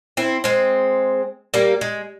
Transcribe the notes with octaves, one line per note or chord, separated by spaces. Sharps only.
C4 E4
G#3 C4
G3 A#3
G#3